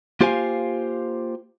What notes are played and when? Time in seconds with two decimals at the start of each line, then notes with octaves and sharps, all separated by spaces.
0.21 A#3 F4 G4 C5 F5 G#5